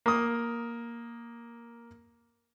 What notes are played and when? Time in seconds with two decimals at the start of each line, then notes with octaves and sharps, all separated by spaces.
0.06 A#3 D#6